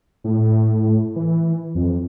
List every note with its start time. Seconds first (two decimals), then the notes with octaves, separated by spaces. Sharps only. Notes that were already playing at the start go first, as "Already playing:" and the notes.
0.24 A2
1.16 E3
1.75 F2